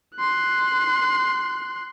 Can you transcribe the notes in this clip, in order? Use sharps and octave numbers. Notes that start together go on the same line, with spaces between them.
C6 F#6